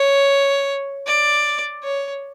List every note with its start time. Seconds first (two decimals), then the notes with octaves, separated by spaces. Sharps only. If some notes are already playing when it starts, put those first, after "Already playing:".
Already playing: C#5
1.06 D5
1.83 C#5